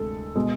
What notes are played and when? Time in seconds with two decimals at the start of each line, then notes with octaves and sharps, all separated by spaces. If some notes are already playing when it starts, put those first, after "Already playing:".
Already playing: D2 C3 G#3 A4
0.36 B2 G#3